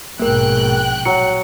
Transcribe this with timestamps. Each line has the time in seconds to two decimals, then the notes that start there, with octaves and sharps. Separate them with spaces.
0.19 A#1 G#2 B2 A#3 A#4 G5 F#6
1.05 F#3 C#7